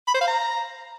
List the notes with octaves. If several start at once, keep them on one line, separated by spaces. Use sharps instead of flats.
B5
C5
F5
A#5